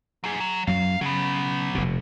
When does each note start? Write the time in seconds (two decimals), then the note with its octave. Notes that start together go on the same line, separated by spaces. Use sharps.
0.24 F#3 G#4
0.40 F#3
0.67 F#2 F#3 F5
1.01 C#3 F#3 B3
1.75 F1 B2